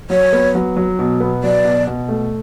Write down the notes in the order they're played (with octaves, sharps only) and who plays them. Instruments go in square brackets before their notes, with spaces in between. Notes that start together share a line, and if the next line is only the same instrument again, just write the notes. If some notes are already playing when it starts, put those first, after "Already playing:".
[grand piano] F#3 [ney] C#5
[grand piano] B3
F#3
F#3
B2
B3
[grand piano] F#3 [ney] D5
[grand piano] B2
B2
A3